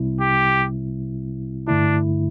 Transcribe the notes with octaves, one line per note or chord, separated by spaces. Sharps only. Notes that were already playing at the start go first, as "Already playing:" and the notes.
Already playing: C2 C3 G3 C4 E4
G4
G2 D3 A3 D4 E4